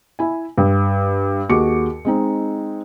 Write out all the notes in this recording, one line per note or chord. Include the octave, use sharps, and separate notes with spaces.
E4 G#5
G2
D#2 F#4 G#4 D6 C#7
G#3 C4 D#4